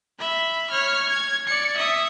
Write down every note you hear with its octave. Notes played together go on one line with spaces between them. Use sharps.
E5 B5
C#5 F6
G#6
D5 C#7
E5 D#6